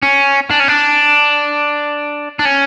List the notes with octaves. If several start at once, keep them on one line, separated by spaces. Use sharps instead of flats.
C#4
D4
C#4
D4
D4
C#4